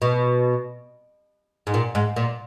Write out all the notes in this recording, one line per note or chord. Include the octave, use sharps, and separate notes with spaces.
B2
G#2
A#2
G#2
A#2